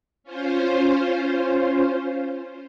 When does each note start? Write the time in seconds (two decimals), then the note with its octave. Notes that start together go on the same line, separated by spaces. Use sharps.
0.24 C#4 F4 C5